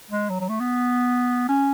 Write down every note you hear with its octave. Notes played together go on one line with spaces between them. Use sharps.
G#3
F#3
F#3
A3
B3
C#4